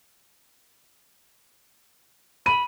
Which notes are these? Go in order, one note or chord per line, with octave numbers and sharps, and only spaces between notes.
B5 D#7